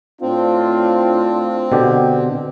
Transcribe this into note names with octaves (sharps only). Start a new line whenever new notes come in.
A2 C4 D4 F4
B2 D3 G4